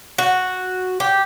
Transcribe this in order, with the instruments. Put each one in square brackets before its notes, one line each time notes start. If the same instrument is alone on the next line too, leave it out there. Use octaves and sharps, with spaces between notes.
[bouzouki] F#4
G4